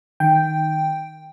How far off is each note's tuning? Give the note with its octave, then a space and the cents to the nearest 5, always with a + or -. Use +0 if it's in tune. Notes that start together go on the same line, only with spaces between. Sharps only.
D#3 +0 G5 +0